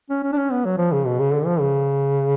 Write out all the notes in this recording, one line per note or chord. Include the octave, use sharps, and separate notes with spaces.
C#4
C#4
D4
C#4
B3
F#3
F3
C#3
B2
C#3
D3
F3
C#3